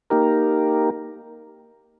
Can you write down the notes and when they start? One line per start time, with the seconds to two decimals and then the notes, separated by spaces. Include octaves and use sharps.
0.10 A#3 D#4 G4 A#4